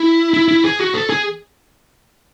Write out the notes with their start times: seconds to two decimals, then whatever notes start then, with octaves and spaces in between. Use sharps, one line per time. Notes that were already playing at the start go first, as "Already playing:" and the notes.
Already playing: E4
0.34 E4
0.48 E4
0.64 G#4
0.80 F#4
0.94 A4
1.09 G#4